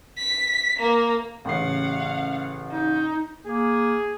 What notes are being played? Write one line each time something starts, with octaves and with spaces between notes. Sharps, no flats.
B6
A#3
A1 C#3 F5 F#5 C7
D#4
A#3 G#4